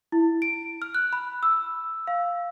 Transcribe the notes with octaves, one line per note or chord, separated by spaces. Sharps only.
E4
D7
F6
F#6
B5
E6
F5